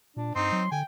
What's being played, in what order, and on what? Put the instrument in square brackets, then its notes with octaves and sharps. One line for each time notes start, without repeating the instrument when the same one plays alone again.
[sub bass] A#2 [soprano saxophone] D4
[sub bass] G2 [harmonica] C4 D#4 [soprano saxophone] C6
[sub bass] F#3
[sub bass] D3 [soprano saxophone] G5 [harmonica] G#5